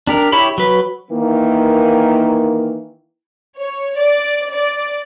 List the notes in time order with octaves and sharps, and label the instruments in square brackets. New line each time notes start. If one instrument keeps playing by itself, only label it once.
[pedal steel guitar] D4 G4 A#4
E4 G4 C#5 B5
F#3 B4
[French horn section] D#3 E3 A#3
[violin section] C#5
D5
D5